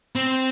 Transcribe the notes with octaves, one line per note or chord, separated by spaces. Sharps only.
C4